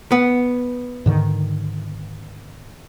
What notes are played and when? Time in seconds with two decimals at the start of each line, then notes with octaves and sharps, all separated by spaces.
0.12 B3
1.06 G#2 D3 D#3